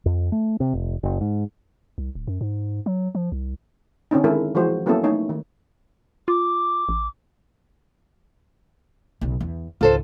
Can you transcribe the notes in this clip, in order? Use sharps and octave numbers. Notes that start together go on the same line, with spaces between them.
F2
A3
C3
F1
F#1
G#2
C2
D1
F#2
G#2
F#3
F3
C2
D3 C4 C#4 D#4
D#3 G#3 E4 A4 A#4
E3 F3 G#3 F#4 C5
F#3 A#3 B3 C#4 E4 A4
A3 D#4 C#5
D#3
F4 D6
A1
B1 C#3
E2
G#1 C#2 F4 A4 C5